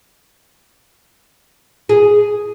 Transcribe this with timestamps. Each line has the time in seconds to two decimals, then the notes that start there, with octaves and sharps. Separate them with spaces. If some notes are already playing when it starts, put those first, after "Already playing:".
1.89 G#4